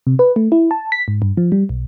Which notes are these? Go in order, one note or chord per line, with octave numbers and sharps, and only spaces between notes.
C3
B4
A3
E4
A5
B6
G#2
G2
F3
G3
B1